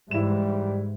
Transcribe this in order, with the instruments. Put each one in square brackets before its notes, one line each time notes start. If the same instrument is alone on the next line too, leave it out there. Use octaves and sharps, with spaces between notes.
[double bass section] G#2 E3 [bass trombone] G3 [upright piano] E4 E7